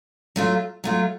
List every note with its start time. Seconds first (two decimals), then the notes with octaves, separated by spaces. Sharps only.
0.36 F#3 A3 F4
0.84 F#3 A3 F4